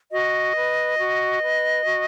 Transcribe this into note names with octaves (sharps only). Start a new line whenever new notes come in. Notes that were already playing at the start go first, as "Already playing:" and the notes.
F#4 D#5
B4
F#4
B4
F#4